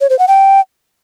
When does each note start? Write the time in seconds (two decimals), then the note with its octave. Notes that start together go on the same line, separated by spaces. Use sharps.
0.01 C#5
0.10 C5
0.19 F#5
0.28 G5